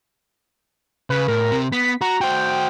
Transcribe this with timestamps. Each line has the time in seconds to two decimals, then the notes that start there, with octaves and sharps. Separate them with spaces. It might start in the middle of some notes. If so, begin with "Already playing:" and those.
1.10 C#3 B4
1.28 A2 A#4
1.51 C3 C4
1.72 B3 B6
2.01 F#4 A#5
2.21 F#4 C5 G5